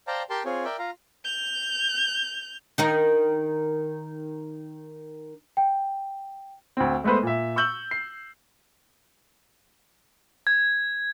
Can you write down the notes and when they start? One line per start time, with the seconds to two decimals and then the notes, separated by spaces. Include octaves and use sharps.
0.07 C5 D5 F5 G5 A5 A#5
0.30 G4 A#4 G5 A5 C6
0.45 C4 F4 G#4 C#5
0.65 A#4 D5 E5 G5
0.79 F4 F5 A#5
1.24 G6 F7
2.78 D#3 D#4 A#4
5.57 G5
6.77 D2 C4
7.04 G#3 A3 B3 B4 C5
7.23 A#2 E5
7.56 C#6 E6 G6 F#7
7.91 C7
10.47 G#6